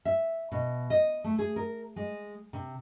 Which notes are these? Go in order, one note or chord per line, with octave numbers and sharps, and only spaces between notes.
E5
B2
D#5
A3
G#4
A#4
G#3
C3